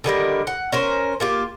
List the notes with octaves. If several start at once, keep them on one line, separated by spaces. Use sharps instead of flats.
D3 D#3 G3 A#4
F#5
C#4 A#4 C5
A#3 F4 G4